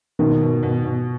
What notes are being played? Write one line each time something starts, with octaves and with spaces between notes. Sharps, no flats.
B2 D#3
B2
B2
B2